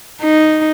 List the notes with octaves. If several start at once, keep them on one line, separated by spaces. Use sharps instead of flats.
D#4